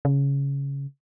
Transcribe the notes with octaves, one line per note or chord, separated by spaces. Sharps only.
C#3